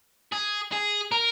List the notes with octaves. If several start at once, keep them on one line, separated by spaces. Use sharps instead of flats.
G#4
G#4
A#4